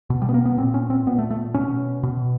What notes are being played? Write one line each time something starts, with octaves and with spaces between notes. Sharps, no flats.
B2
G3
B3
A#3
B3
A#2 C4
C#4
C4
A#2 B3
A3
A3
B2 C#4
B2